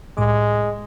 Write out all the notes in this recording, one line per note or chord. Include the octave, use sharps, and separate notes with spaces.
C2 A2 G#3 D6